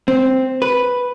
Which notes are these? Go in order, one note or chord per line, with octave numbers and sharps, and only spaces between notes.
C4
B4